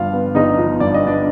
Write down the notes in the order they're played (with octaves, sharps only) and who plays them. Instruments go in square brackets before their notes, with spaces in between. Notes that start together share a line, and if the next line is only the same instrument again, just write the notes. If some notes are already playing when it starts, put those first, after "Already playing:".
Already playing: [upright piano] G1 G2 F3 F4 F5
B3
G1 D#4 D#5
F3
G2 D5
D#5
B3 D4 D5